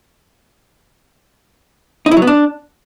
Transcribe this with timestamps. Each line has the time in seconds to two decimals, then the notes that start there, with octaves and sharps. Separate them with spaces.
2.06 D#4
2.11 E4
2.17 F#3
2.22 B3
2.27 D4